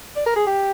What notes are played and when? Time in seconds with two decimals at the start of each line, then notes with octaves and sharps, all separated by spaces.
0.16 D5
0.26 A#4
0.36 G#4
0.47 G4